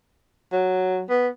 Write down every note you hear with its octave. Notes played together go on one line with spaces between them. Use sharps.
F#3
B3